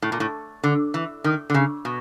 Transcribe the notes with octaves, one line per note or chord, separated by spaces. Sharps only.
A2
A#2
A2
D3
E3
D#3
D3
C#3
B2